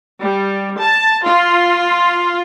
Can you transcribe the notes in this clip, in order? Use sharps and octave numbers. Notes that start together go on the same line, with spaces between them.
G3
A5
F4